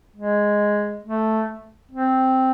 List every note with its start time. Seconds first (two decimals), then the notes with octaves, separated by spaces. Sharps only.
0.16 G#3
1.04 A3
1.91 C4